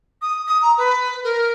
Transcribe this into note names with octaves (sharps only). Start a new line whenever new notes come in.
D#6
D#6
A#5
B4
A#4